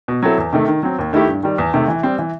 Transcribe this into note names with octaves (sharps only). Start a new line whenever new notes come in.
B2
F#3 C4 E4 A4
E2
C3 D#3 A3
D#3
F#3 C4
D#2
D#3 A3 E4 G4
G2
D#3 G3
E2
C3 D#3 A3
E3
G3 C4
E3